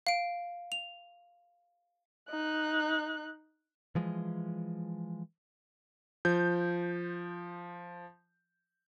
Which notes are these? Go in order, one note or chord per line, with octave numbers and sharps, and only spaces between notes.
F5 D7
F7
D#4 F#6
E3 F3 G#3
F3 G6